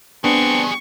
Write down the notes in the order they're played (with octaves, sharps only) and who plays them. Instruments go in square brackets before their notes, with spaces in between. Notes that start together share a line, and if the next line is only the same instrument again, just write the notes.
[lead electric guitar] G3 G#4 [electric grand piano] B3 D4 [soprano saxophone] C4 [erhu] C#6